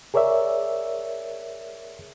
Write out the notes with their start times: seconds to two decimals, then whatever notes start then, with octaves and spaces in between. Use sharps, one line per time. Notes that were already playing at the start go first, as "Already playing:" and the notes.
0.14 G#4 A#4 C#5 D5 E5